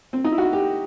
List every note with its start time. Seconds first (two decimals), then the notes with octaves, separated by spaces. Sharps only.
0.13 C4
0.24 D#4
0.32 E4
0.38 F#4
0.53 G4